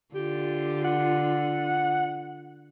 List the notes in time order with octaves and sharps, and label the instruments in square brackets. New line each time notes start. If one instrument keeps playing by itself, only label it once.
[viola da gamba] D3 F4 [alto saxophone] G4
[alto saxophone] F#5